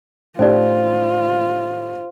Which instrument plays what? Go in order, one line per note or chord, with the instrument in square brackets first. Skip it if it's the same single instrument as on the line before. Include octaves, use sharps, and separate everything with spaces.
[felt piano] A2 G4 [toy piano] C#4 D#4 D5 [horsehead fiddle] F4 [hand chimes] C5